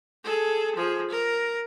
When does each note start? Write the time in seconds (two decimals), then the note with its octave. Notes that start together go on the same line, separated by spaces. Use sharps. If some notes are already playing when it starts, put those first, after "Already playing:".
0.24 G#4 A4
0.75 F3 G#4
1.10 A#4